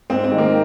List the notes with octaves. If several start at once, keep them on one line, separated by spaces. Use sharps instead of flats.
G#2 C4
C4
D#3 G#3
A#3